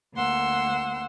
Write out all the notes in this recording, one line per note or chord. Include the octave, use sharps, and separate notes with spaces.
D2 A#3 F#5 C6 E6